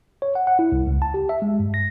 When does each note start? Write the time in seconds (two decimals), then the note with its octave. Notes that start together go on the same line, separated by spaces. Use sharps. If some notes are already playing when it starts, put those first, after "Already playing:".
0.22 C#5
0.35 F#5
0.47 F#5
0.59 E4
0.72 C2
0.87 C#2
1.02 A5
1.14 G4
1.29 E5
1.42 G#3
1.59 G2
1.74 A#6